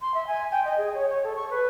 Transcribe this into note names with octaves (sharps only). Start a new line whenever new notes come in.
C6
E5
G#5
G5
D#5
G#4
C#5
C#5
A4
C#6
B4